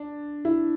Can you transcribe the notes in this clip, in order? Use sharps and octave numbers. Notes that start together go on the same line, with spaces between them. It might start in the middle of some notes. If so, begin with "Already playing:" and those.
Already playing: D4
E4